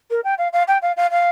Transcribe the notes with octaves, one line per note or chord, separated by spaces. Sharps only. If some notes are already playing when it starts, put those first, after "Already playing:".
A#4
G5
F5
F5
G5
F5
F5
F5